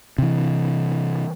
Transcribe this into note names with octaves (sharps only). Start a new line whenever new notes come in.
C3 E3